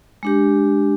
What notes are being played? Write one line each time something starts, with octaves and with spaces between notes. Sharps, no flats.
G#3 D4 G4